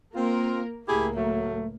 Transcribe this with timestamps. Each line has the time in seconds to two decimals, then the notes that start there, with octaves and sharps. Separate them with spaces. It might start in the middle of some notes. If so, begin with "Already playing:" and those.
0.15 A#3 C4 F4 A#4
0.88 C#2 A2 A#3 E4 G4 G#4
1.16 F#3 A3